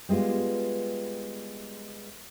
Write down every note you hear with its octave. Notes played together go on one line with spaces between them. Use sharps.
G3 G#3 B3 F4